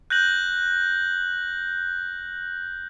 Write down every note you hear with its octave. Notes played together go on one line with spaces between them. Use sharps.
F#6 G6 A#6 F#7